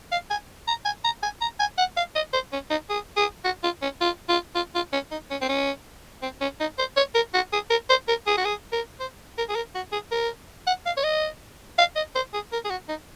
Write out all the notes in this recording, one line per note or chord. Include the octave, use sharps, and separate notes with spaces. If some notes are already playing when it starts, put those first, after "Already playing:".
F5
G#5
A#5
G#5
A#5
G#5
A#5
G#5
F#5
F5
D#5
C5
C#4
D#4
G#4
G#4
F#4
F4
C#4
F4
F4
F4
F4
C#4
D#4
C#4
C4
C#4
C4
C#4
D#4
C5
C#5
A#4
F#4
G#4
A#4
C5
A#4
G#4
F#4
G#4
A#4
C5
A#4
G#4
A#4
F#4
G#4
A#4
F#5
F5
C#5
D#5
F5
D#5
C5
G#4
A#4
G#4
F#4
D#4